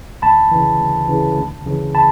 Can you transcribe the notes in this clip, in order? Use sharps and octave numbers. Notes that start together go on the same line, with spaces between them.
D2 A5 B5
C#3 E3
D2
C#3 E3
D2
C#3 E3
A5 B5